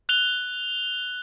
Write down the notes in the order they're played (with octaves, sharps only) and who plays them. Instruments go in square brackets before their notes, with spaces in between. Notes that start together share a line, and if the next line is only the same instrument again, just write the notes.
[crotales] F#6 F7 G7